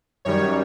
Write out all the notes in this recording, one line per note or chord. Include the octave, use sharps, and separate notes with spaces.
F#2 D#3 G3 C#5